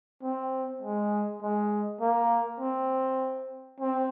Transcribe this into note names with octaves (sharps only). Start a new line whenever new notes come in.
C4
G#3
G#3
A#3
C4
C4